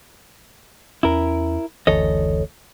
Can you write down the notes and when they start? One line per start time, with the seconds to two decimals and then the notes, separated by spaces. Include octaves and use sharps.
1.03 E2 C#4 E4 A#4
1.87 F#1 D2 E3 A4 C#5 D#5